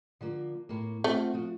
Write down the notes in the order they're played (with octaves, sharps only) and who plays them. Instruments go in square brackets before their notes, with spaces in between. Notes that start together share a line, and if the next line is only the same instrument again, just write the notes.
[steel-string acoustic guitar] D3 F3 A#3
A2 A#3
[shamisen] A3 [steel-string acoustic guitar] C4 F4 F#5
[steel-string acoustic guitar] F3 F#4